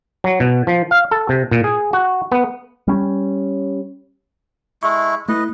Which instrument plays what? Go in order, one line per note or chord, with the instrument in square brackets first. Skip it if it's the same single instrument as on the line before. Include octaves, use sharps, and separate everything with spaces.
[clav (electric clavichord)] F#3
B2
F3
F5
A4
C3
A#2
G#4
F#4
B3
[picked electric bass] G3 C#4
[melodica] G#3 A3 E4 [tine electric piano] C#6
[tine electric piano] A3 E4 [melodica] B4 D#5